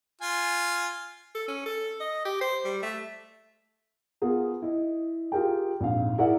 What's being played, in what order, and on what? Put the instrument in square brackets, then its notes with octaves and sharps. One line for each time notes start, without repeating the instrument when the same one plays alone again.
[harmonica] F4 G#5
[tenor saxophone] A4
C#4
A4
D#5
G4
C5
G3
A3
[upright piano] B3 F4 G#4 A#4
E4 D#5
F4 G4 G#4 A#4 G5
A#1 F2 G#2 F5
E4 G#4 A#4 D5 E5 F#5